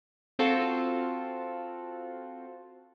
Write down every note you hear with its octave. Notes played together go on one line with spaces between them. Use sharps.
C4 F4 F#4 A4